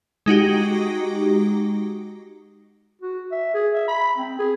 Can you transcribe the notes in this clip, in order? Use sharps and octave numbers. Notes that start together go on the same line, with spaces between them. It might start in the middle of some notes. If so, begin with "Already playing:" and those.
G#3 D#4 F#4 G4
F#4
E5
G#4
E5
B5
C4
G#4